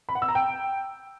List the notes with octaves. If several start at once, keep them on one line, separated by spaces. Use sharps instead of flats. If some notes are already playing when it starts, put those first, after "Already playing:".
B5
F#5
E6
A#5
G5